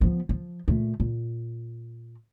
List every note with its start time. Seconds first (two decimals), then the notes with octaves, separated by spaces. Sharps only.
0.01 F3 B3
0.29 F3
0.68 A#2 A3
1.00 A#2